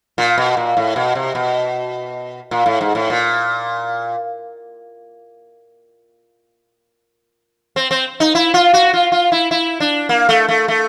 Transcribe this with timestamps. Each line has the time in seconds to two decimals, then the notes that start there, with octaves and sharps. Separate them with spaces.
0.18 A#2
0.38 B2
0.57 A#2
0.77 A2
0.96 B2
1.15 C3
1.35 B2
2.51 A#2
2.66 A2
2.81 G#2
2.95 A2
3.10 A#2
7.76 C4
7.91 C4
8.20 D#4
8.35 E4
8.54 F4
8.73 F#4
8.93 F4
9.12 F4
9.32 E4
9.51 E4
9.80 D4
10.09 A#3
10.29 A3
10.49 A3
10.68 A3